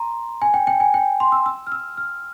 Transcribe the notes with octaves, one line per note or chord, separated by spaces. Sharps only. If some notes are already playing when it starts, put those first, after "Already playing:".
Already playing: A#5 C6
G#5
G5
G5
G#5
G5
C6
E6
E6
F6
E6
F6